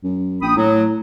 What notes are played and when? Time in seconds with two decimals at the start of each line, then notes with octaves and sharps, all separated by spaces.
0.04 F#2
0.42 A#1 G5 B5 D#6
0.56 A2 F#3